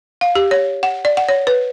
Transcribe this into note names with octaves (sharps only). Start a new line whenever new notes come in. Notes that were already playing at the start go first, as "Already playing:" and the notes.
F5
G4
C#5
F#5
D5
F#5
C#5
B4